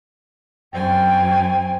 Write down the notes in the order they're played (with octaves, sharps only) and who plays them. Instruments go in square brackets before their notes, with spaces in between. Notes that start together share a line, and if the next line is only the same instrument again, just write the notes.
[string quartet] F#2 C4 G#5 [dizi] G5